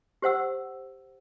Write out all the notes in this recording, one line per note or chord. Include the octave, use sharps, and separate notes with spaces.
G4 C5 F#5 E6